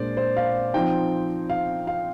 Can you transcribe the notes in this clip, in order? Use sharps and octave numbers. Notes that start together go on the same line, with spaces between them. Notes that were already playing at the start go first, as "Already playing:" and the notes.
Already playing: A#2 G#3 D4 C5 D5
C5
F5
F3 C4 D#4 G5
F5
F5